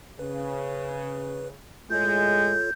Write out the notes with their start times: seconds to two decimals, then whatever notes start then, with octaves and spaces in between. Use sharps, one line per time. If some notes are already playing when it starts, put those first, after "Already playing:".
0.19 C#3 B4
1.90 A2 G#3 F4 A4 C#5 G6